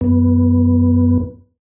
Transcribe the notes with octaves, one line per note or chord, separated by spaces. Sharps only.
F#2 B3